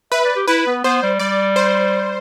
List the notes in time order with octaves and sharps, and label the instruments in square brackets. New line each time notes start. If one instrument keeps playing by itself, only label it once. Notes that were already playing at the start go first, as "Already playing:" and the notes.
[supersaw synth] B4 [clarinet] E5
[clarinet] D5
G4
[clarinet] E4 [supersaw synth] B4
[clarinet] B3
[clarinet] B3 [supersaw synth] C5
[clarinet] G3
[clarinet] G3 [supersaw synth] D5
[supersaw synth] C5